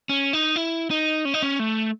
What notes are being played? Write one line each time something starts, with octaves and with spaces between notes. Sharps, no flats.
C#4
D#4
E4
D#4
C#4
D#4
C#4
A3